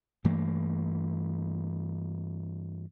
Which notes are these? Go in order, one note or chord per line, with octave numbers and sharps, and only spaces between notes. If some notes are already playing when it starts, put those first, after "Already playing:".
G2 E3 A3 A#3